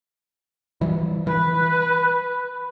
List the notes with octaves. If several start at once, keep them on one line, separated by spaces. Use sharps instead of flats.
E3 G3
E3 B4